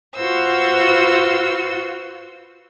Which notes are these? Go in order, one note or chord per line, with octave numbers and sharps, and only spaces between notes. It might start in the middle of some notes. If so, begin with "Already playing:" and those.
F4 F#4 B4 C5 E6